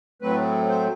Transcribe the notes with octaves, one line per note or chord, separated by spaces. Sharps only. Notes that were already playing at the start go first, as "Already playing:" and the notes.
A2 F#3 A3 C4 B4
C5